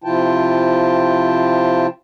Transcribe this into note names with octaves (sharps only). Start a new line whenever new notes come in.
C3 F3 E4 F4 G5 A5